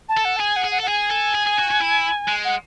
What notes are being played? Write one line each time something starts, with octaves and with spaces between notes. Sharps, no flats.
A5
A4
F#5
A5
G#4 G#5
F#5
G#4
F#5
A4
F#5
G#4 G#5
A4
G#4
G#4
F#4
F#4
E4
G#3
F#5